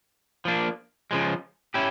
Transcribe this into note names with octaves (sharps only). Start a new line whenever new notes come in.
F3 A#3 D4
C#3 F3 G#3
C#4 E4 G4